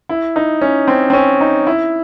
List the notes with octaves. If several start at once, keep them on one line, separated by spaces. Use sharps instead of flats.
E4
D#4
C#4
C4
C4
C#4
D#4
E4